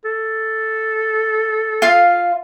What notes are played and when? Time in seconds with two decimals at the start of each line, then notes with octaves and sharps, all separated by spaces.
0.05 A4
1.82 F4 F5